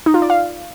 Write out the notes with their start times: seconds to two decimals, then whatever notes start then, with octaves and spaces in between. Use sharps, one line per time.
0.06 D#4
0.14 F4
0.22 D5
0.30 F5